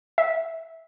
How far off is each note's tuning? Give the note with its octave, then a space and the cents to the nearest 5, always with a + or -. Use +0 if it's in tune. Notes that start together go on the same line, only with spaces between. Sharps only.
E5 -15